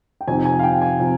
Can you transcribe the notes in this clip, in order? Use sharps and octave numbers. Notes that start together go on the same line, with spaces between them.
G5
F2 C3 F3 C4 D#4 G#5
G#5
F5
G5
G#5
C3 F3